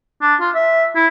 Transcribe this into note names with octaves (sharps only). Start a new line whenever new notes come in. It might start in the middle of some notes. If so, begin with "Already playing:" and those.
D4
F4
E5
E4